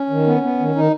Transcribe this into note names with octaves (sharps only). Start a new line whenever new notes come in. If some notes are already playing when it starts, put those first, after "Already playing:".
Already playing: C#4
D#3
B3
B3
D#3
D#3 D#4